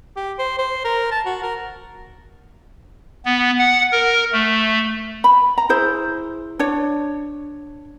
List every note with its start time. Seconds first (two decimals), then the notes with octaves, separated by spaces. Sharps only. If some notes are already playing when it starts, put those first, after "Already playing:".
0.16 G4
0.39 C5
0.58 C5
0.84 A#4
1.11 A5
1.26 F#4
1.42 A#4
3.25 B3
3.59 F#5
3.92 A#4
4.33 A3
5.24 B5
5.58 A#5
5.69 E4 G#4 C5
6.59 D4 C#5